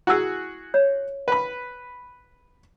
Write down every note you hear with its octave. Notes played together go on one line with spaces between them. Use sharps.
E4 F#4 G#4 G#5 E6
C#5
B4 B5